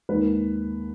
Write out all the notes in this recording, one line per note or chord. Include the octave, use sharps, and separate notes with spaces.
D#2 D#3 G#3 B4